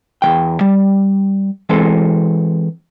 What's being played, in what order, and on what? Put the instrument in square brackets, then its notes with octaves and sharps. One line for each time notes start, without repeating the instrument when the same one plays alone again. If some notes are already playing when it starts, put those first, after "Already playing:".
[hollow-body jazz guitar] E2 D#3 G5
G3
E3 G#3 C4 A4